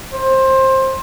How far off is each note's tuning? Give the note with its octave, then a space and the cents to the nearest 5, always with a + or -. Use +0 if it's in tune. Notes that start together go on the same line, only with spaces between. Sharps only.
C5 +20